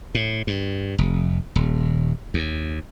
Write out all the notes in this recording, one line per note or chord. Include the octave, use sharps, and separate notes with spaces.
A2
G2
F1
D#1
D#2